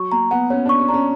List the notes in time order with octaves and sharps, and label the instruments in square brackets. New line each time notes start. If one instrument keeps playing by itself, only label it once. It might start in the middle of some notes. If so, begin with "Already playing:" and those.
Already playing: [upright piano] F#3 [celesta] C#6
[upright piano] A#3 [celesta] A#5
[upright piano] B3 [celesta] F#5
[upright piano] C#4 [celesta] C#5
[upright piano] D4 [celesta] C#6
[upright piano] C#4
[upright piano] D4 [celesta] A#5
[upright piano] C#4